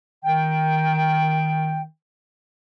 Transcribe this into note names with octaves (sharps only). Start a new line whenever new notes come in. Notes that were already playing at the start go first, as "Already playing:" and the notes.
D#3 G5